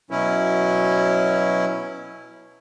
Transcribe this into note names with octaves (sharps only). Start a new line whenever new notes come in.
B2 F#3 C#4 E4